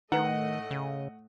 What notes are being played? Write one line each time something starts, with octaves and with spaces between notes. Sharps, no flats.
A2 D#3 A3 D#4 B4 D#5 F#5
C#3